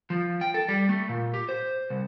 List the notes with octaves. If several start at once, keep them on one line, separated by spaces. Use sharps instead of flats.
F3
G5
A4
G3
A3
A#2
G4
C5
C2